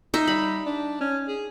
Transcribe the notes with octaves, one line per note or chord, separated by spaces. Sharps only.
D#4 E5
G3 B5
D4
C#4
G#4